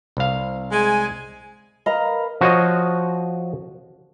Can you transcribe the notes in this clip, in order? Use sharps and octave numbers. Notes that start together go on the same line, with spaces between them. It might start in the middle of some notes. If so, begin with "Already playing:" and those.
C2 F5
G#3 G#5
A#4 B4 D#5 F5 A#5
F3 F#4 C5 C#5 D#5